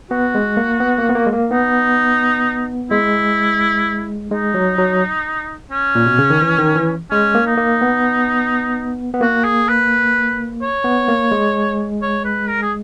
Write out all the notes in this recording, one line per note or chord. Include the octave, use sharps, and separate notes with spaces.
B3 F#4
G#3
A#3
B3
A#3
B3
A#3
G#3
A#3
B3 D#4
G#3 E4
G#3 D#4
F#3
F#3
C#4
A#2
B2
C#3
D#3
E3
D#3
E3
G#3 C#4
A#3
D#4
A#3
B3
B3
A#3 F#4
G#4
B4
C#5
B3
A#3
G#3
C#5
B4
A#4
G#4